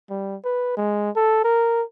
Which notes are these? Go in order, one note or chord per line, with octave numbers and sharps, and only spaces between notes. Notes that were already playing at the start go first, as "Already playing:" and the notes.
G3
B4
G#3
A4
A#4